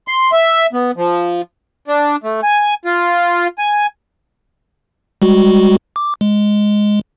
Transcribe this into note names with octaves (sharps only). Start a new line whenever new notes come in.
C6
E5
B3
F3
D4
A3
G#5
F4
G#5
G3 G#3 F#4
D6
G#3